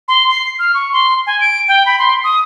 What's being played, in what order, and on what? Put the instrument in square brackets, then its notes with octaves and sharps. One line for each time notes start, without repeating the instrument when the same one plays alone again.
[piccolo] C6
C7
F6
C#6
C6
G#5
D7
G5
B5
C6
D#6